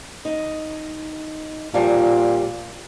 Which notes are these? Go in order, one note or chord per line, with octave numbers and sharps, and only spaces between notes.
D#4
A#2 F3 G3